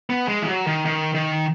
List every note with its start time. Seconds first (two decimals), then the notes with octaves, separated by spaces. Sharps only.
0.10 B3
0.28 G#3
0.42 E3
0.47 F#3
0.67 D#3
0.86 D#3
1.15 D#3